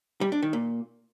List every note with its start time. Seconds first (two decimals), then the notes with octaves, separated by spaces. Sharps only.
0.21 G3
0.32 D4
0.43 D#3
0.53 A#2